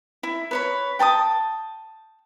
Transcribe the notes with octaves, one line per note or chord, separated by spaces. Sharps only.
E4
B4 C#5 B5
G5 A5 B5 D#6